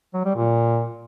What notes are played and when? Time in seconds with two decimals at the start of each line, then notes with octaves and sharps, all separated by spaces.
0.14 F#3
0.25 G3
0.36 A#2